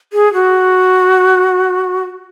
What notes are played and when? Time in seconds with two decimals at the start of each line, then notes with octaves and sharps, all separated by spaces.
0.13 G#4
0.34 F#4